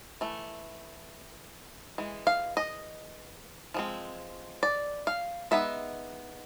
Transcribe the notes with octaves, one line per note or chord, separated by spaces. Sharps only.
E3 A3
E3 G#3
F5
D#5
F3 G#3 C4
D5
F5
G#3 B3 D#4 E5